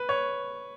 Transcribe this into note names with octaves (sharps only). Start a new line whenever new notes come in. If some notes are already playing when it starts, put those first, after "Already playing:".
Already playing: B4
C#5